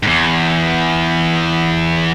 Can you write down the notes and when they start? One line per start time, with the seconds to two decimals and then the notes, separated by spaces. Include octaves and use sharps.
0.03 E2 G#2